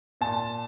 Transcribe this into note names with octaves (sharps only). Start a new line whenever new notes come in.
A#2 A5